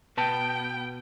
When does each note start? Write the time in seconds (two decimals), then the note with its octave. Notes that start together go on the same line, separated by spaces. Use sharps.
0.17 B2 B3 B4 G5 A5